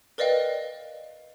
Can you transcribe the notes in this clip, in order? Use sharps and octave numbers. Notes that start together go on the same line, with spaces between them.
A#4 B4 D5 D#5 F5 G5